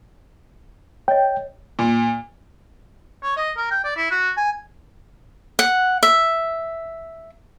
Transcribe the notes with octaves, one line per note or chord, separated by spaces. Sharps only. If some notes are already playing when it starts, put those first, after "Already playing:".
C#5 D#5 G5
A#2
C#5
D#5
A#4
G5
D5
E4
F#4
G#5
F#5
E5